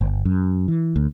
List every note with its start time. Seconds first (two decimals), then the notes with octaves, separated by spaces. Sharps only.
0.01 G1
0.25 F#2
0.68 E3
0.96 D2